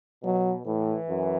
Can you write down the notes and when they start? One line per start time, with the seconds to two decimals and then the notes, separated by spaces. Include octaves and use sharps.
0.23 B2 F#3
0.65 A2 E3
1.09 F#2